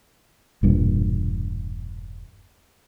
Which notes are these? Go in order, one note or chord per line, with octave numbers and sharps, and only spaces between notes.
E1 G2 A#2